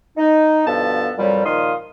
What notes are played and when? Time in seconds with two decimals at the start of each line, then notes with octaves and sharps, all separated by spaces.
0.17 D#4
0.67 G2 B2 F3 B3 A4 A5
1.18 F2 A#2 F#3 G3
1.46 A#2 D#3 F3 F5 C6 D#6